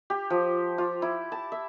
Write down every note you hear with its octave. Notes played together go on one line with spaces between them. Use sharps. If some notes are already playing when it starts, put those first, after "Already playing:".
G4
F3
F4
E4
A5
E5